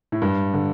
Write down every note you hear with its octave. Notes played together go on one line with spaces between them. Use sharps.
A2
G2
D3